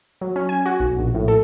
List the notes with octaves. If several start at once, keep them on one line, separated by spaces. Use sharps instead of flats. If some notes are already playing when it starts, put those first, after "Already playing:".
F#3
C#4
G#5
F#4
B1
A#1
A2
A4